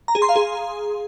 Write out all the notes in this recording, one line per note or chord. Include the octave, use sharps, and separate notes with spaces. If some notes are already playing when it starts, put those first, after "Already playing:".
A#5
G#4
C6
F5
G#4